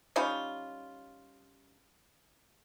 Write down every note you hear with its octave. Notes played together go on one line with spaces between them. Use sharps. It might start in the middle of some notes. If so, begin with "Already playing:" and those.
G3 C#4 D#4 F4